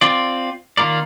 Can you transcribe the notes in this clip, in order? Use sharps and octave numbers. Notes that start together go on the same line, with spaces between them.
C4 F4 D5
D#3 A#3 F4 A#4 D5